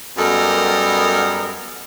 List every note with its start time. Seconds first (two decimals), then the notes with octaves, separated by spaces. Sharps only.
0.17 F#2 G3 B3 A4 A#4 D#5